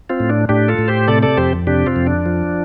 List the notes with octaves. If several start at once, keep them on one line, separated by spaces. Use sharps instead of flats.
C4 F4
A2
D4
A2 D4 G4
F4 A4
A2
G4 C5
C3 A4 D5
A4 D5
F2 G4 C5
C3 D4 G4
C4 F4
F2
D4
F3